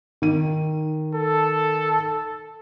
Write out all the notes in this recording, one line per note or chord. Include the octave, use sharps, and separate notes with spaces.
D#3 D#7
A4